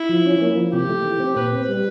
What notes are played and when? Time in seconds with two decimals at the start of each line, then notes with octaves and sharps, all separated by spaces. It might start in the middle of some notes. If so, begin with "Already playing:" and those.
Already playing: E4
0.09 F3
0.26 C#4
0.42 A#3
0.56 F3
0.72 C3 G4
0.89 A3
1.05 E3
1.20 C4
1.36 A#2 B4
1.52 C4
1.69 G3